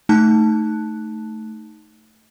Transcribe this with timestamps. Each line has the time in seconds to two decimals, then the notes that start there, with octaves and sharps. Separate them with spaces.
0.09 A3 D#4 A5 F#6